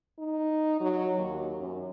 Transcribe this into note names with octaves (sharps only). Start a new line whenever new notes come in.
D#4
F#3
D#2
F#2